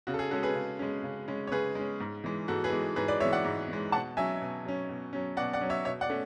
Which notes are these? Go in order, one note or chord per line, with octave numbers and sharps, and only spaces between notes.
C#3 F#4
A4
G#4
G#3 C#4 F#4 A4
G#4 B4
C#3
G#3 C#4
C#3
G#3 C#4
C#5
C#3 G#4 B4
G#3 C#4
G#2
E3 G#3
G#2 F#4 A4
G#4 B4
E3 G#3
G#2 G#4 B4
B4 D5
E3 G#3 C#5 E5
D5 F#5
G#2
E3 G#3
B2 F#5 A5
F#3 C#4 E5 G#5
B2
F#3 C#4
B2
F#3 C#4
B2 D5 F#5
D5 F#5
F#3 C#4
C#5 E5
B2 C#5 E5
D5 F#5
A3 C#4